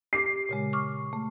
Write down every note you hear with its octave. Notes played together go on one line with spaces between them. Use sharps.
G4 D6 C7
A#2 C#3 G#3
C#6 D6 F6
A3